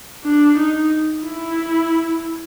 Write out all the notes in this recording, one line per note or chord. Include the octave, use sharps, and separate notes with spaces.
D4
D#4
E4